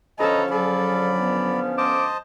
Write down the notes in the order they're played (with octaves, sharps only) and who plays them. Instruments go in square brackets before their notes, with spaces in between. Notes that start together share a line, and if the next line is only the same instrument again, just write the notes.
[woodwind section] D3 F3 C#4 [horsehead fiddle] A4 C#5 [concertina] B4 A#5 [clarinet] D#5
[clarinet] F#3 [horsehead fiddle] G#4 A4 [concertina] D5 B5
[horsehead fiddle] B3
[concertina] C5 D#5 A5 [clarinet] D6